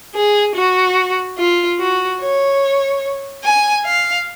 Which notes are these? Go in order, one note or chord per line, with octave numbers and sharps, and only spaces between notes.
G#4
F#4
F4
F#4
C#5
G#5
F5